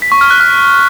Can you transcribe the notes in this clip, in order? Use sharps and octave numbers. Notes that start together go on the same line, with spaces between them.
B6
C#6
F6
F#6
F6